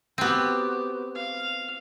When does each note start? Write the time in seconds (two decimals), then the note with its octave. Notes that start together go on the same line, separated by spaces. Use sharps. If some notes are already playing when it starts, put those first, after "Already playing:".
0.18 B3 C4 F#4 G4
1.15 F5